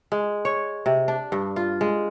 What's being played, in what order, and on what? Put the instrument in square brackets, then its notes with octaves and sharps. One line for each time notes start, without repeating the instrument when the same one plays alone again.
[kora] G#3
C#5
C3
D4
G2
F4
G#3